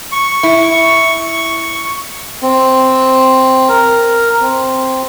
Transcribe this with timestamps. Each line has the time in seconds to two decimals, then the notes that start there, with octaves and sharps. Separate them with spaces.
0.12 C#6
0.43 E4
2.42 C4
3.69 A#4
4.41 C4